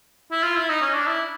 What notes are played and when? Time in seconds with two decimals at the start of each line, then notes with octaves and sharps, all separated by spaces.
0.31 E4
0.43 F4
0.56 E4
0.69 D#4
0.81 C#4
0.94 D4
1.07 E4